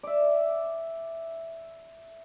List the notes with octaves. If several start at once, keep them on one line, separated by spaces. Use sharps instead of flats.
D5 E5